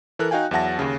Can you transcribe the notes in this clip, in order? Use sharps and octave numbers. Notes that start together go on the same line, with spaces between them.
E3 A4 A#4 F#6
D#4 F#4 F5 G5 G#5
E2 F#3 E5 F#5 A5 A#6
D#2 C#3